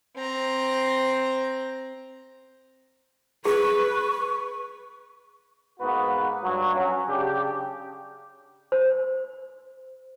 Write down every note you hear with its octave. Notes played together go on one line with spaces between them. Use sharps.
C4 A#5
G#4 B4 C#6
G#2 A#3 B3 F#4 B4
G2 F#3
F#3 C#4
C#3 D4 G4
C5